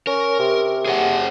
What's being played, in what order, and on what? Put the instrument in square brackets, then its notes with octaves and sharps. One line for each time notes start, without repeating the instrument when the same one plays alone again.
[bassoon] C#4 [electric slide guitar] A#4
[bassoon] C3
[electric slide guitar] G#4 C#5 F#5